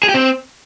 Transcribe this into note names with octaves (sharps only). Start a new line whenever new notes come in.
G#4
G4
C4